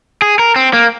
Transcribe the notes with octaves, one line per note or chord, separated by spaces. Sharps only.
G#4
A#4
C4
A#3